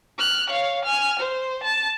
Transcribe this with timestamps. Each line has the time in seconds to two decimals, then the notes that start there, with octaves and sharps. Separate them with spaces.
0.18 F6 F#6
0.50 C#5 F5
0.85 G#5 F6
1.19 C5
1.63 A5